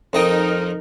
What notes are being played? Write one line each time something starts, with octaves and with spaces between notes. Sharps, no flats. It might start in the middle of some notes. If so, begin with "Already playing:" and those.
F2 D#4 A#4 D#5 G5